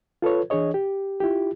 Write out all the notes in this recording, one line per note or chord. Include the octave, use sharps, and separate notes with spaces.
F4 A4 B4 C#5
E3 D4 G#4 C#5 D#5
G4
E4 F4 G4